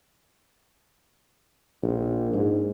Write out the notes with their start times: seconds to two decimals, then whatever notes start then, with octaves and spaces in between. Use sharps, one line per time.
1.83 A#1
2.33 G#2